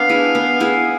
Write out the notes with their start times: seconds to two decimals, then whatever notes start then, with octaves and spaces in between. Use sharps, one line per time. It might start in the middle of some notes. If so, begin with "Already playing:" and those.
Already playing: B3 D4 B4 F5
0.09 E4 G#4
0.35 B3
0.60 E4 G#4